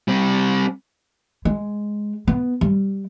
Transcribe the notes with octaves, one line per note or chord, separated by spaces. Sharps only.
G3 C4
G#3
B3
G3